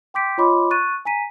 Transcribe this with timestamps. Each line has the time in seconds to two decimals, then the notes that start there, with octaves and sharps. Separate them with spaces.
0.14 G5 C6 D6 G6 B6 D7
0.38 F4 C#5 D#5 B5 C6 D6
0.71 C#6 F#6 A6 D#7
1.05 G#5 A#5 B6 D#7